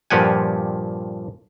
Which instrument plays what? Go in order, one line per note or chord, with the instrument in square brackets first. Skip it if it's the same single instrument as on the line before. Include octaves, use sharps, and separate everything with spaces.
[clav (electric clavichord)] G2 A#2 F3 G4 F#5 G#5